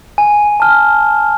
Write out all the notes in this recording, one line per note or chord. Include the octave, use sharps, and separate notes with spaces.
G#5
A5 F6